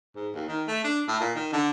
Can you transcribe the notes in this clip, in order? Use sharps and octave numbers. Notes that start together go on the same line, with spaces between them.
G#2
D#2
D#3
A3
D4
A2
A#2
D#3
D3